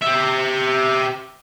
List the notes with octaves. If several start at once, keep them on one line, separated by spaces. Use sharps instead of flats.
G4 E5